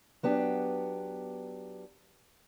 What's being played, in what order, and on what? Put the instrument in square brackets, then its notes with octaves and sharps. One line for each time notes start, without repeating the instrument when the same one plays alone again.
[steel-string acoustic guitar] F#3 B3 D4 G4